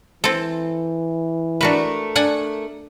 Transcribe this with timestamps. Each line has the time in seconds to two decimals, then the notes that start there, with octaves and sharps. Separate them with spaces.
0.24 E3 C4 A4
1.61 A3 D4 F#4 A#4 B4
2.16 D4 F#5 G#5